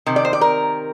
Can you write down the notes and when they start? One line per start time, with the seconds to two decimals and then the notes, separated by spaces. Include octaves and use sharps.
0.06 C3 D#3
0.16 D5
0.25 C5
0.33 D5
0.41 A#4